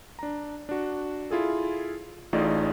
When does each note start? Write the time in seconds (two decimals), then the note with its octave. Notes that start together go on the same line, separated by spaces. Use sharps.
0.19 D4 A#5
0.69 D4 F#4
1.30 E4 F4 G#4 A4
2.33 A1 A2 D#4 F4 G#4 D5